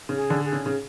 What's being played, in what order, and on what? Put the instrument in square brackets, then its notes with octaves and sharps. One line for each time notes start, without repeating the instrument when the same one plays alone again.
[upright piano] C#3
[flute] G#4
[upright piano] D3
[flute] G#4
[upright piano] C#3
C#3